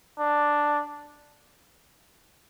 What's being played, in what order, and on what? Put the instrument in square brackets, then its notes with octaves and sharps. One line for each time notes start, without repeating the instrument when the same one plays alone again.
[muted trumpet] D4